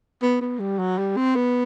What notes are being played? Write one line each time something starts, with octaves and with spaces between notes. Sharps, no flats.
B3
B3
G3
F#3
G3
C4
B3